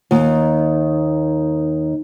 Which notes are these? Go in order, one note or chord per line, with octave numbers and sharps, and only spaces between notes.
D#2 D#3